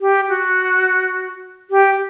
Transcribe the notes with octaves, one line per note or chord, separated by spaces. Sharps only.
G4
F#4
G4